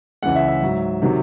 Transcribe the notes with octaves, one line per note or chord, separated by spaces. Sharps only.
C#2 C#3 E3 G#3 F#5
E5
E5
G#2 F#3
C3 D#3 F#3